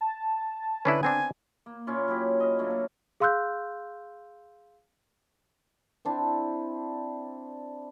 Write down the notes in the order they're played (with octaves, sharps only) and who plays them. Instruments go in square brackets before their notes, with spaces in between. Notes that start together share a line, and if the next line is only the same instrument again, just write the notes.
[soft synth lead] A5
[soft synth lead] D3 [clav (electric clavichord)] C#4 D4 E4 [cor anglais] B4
[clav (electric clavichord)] B3 C4 D4 [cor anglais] G#5
[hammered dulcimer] A#3
A#2 C#4 E4 F4
F#3 E4 G4
D#5 F5
D3 F#3 A3 A#3
F5
[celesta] G#4 F5 C6 E6 F#6 G6
[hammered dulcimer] C4 D4 E4